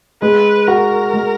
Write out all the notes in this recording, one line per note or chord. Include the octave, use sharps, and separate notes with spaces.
G#3 B4
F#4 A#4
G#3